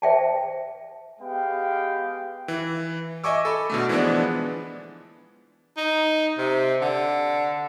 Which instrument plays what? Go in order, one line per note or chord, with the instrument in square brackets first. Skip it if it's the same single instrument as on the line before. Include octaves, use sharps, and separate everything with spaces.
[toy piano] C5 E5 G5 A5
[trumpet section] G#3 B3 G4 F5 G5
[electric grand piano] E3
D#5 E5 G#5 C#6 D6 E6
A4 B5
B2 D3 A3
E3 F3 G#3 B3 D4
[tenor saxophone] D#4
C3
D3